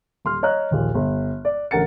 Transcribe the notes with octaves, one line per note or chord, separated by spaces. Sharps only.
D#1 C6 F6
C#5 D#5 A#5 F#6
A#1 D#2 A#2
G1
D5
A1 D3 A#4 F#5 A6 C#7